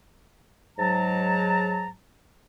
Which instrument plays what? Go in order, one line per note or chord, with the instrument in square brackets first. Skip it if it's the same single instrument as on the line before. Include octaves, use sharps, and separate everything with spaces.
[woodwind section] G#2 F#3 A5 A#5